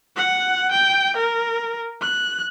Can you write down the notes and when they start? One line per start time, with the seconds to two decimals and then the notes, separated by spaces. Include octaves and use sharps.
0.17 F#5
0.72 G5
1.17 A#4
2.02 F#6